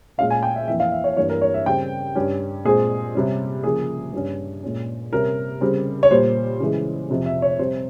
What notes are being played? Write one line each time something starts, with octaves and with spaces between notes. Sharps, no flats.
A#2 G#3 C#4 F5
G#5
G5
E5
F2 E3 A#3 E5
F5
E5
C#5
G2 E3 A#3 C#5
A#4
C#5
E5
C#3 G3 C4 G5
G2 G3 C#4
A#2 G#3 C4 G#4
C3 G3 C#4
C#3 F3 A#3 G#4
G2 G3 C#4
A#2 G#3 C#4
C3 G3 C#4 A#4
C#3 G3 C4
C#5
A#2 G3 A#3 C5
C#3 E3 G#3
F2 C3 F3 C4
E5
C#5
C3 G3 C4 C5